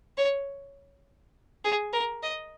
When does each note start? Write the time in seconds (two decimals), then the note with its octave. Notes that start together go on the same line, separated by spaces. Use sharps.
0.18 C#5
1.64 G#4
1.93 A#4
2.23 D#5